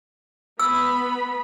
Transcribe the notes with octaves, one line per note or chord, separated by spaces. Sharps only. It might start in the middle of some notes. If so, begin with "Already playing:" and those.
B3 B5 E6